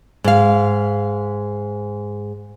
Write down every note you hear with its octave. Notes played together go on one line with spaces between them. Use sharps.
G#2 F5